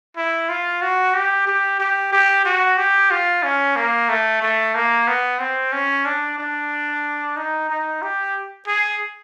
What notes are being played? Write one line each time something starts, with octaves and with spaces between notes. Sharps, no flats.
E4
F4
F#4
G4
G4
G4
G4
F#4
G4
F4
C#4
A#3
A3
A3
A#3
B3
C4
C#4
D4
D4
D#4
D#4
G4
G#4